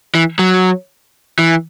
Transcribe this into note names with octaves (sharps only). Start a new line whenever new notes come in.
E3
F#3
E3